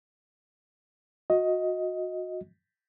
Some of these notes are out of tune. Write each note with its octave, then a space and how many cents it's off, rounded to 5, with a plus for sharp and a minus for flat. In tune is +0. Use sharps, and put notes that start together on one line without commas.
F#4 -25 D#5 +15